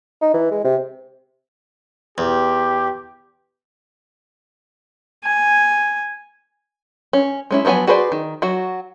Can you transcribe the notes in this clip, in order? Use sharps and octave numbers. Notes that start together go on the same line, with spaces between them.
D#4
E3
G#3
C3
E2 G4
G#5
C#4
G#3 C#4 E4
F3 F#3 B3 C#5 G#5
F#4 G#4 B4 C5 D5
D#3
F#3 F#4